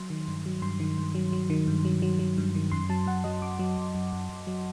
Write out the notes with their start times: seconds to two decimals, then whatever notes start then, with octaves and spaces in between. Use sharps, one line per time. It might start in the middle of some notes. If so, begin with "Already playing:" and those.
Already playing: F#3 C6
0.10 D#3
0.28 G2
0.46 F#3
0.62 G2 C6
0.80 D#3
0.98 G2
1.15 F#3
1.33 F#3
1.50 D#3
1.67 G2
1.85 F#3
2.02 F#3
2.19 F#3
2.38 G2
2.55 D#3
2.72 F#2 C6
2.89 F#3 A5
3.07 F#2 F#5
3.24 F#3 D#5
3.42 F#2 D6
3.59 F#3
3.77 F#2
3.95 F#2
4.12 F#2
4.29 F#2
4.47 F#3